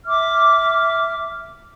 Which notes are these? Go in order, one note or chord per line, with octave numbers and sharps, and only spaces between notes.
E5 D6 F6